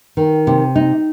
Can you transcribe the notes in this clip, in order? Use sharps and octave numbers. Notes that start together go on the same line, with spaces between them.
D#3
C3
D#4